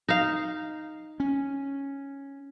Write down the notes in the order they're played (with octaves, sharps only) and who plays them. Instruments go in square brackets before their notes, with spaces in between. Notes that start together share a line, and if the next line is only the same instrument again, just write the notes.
[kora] D#4 F5
[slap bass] C#4